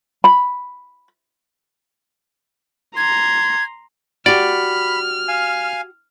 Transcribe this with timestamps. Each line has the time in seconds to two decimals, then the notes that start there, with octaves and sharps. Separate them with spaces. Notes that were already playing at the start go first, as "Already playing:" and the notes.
0.24 B5
2.97 A#5 C6 G#6
4.26 F#4 G4 D5 B5 F6
5.28 F5 G#5